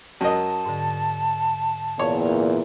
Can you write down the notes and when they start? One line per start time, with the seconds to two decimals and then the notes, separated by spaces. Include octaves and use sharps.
0.21 F#2 F#4 A#4 D#5 A5
0.65 G#2 D3
1.99 E2 A#2 C#5